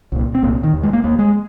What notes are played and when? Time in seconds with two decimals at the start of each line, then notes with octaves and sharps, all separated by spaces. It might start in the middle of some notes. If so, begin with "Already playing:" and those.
0.12 C2 A#2
0.35 C4
0.43 C2 A#2 A#3
0.63 D#3
0.73 D#2
0.83 G#3
0.93 A#3
1.04 D#2 A#3
1.19 G#3